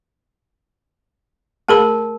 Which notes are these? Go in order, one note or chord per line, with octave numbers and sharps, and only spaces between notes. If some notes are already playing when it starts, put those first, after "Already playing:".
A3 G#4 A#4 A5 B5